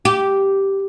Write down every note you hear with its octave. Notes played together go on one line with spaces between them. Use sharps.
G4